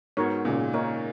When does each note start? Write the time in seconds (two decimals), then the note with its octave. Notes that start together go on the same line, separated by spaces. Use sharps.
0.17 G#2 B3 F#4 A#4 C#5
0.45 A#2 C#3 G#3 C#4
0.73 A#3 D#4 A#4 C#5